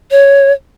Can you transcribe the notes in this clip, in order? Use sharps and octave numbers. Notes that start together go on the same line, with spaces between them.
C#5